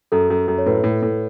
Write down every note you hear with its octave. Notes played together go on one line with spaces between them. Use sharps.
F#2 A4
F#2
F#2
C#5
A2 B4
A2
A2